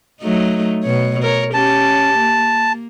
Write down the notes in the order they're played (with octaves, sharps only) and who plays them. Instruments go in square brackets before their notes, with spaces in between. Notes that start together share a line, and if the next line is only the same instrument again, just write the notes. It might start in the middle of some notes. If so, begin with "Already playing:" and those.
[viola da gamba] F#3 A3 D#4
B2 C#5
A#4 C#5
[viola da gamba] C#4 G4 [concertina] A5
[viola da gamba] A#3